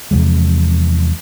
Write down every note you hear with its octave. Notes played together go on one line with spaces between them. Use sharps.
E2 C3 F3 G#3